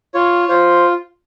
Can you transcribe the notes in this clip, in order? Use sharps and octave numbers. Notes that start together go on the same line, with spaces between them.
F4 C#5
F4 C5